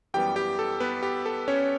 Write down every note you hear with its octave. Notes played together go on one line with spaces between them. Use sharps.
F#2 E3 G3 B3 G4 G5
G4 G5
A4
B3 B4
G4
A4
C#4 C#5